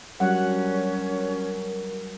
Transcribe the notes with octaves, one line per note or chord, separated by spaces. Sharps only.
F#3 G3 C#4 A#4 F#5